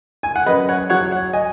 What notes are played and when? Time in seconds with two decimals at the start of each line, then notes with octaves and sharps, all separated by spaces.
0.23 G#5
0.36 F#5
0.46 F#2 B4 D#5
0.69 C#5 F#5
0.90 F#3 C#5 F#5
1.11 C#5 F#5
1.33 D#5 G#5